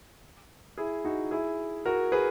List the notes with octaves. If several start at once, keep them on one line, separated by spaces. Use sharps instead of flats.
E4 G#4
D#4 F#4
E4 G#4
F#4 A#4
G#4 B4